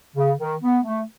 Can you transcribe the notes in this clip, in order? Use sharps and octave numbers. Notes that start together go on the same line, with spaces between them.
C#3
D#3
B3
A3